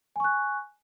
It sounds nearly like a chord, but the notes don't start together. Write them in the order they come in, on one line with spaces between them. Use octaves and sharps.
G#5 C#6 F#6